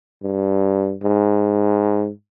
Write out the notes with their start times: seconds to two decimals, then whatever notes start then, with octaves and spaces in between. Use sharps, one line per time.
0.23 G2
1.03 G#2